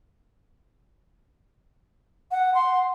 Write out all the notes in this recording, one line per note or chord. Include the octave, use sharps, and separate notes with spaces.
F#5
C6